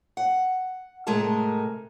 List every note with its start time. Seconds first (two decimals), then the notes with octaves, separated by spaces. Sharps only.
0.17 F#5
1.07 A2 C3 G#3 A3 A#4 A5